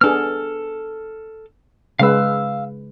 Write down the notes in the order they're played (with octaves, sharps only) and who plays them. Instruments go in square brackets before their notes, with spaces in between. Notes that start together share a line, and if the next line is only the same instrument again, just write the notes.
[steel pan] B3 D4 G#4 [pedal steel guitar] A4 F6
[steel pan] C#3 G#3 B4 [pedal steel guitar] F5 E6